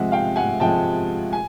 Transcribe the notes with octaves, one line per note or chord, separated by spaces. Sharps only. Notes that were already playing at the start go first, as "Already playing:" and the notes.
Already playing: C3 F3 G#3 E5 F#5
F5 G5
F#5 G#5
C3 F3 G#3 G5 A5
G#5